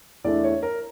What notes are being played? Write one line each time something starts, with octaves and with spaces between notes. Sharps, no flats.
E2 E3 A3 D4 D5
C#5
A#4